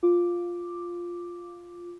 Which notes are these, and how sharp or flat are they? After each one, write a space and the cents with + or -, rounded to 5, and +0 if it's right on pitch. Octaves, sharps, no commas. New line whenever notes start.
F4 +0 D6 +0